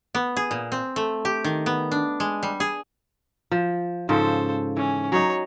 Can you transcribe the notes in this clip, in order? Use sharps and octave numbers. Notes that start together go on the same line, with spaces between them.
B3
G#4
A#2
C4
A3
G4
D#3
B3
D4
G#3
G3
G#4
F3
G#2 C#3 F3 A4 C5
E3 C#4
F#3 D#4 C#5